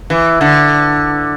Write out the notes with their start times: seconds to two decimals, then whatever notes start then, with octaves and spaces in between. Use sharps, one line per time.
0.10 E3
0.41 D3